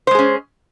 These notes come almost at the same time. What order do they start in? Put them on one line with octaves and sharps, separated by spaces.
C5 G#3 G#4 C#4